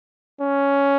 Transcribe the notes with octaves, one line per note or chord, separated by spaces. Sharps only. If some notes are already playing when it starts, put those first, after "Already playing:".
C#4